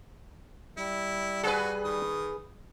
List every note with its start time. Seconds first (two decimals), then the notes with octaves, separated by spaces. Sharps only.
0.78 G3 E4
1.43 F#4 G#4 B4
1.84 D#3 D#6